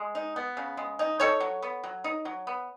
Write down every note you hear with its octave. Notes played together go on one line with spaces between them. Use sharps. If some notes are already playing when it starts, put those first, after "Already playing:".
Already playing: G#3
D#4
B3
C#3
G#3
D#4
D#4 A4 C#5
F#3
B3
F#3
D#4
F#3
B3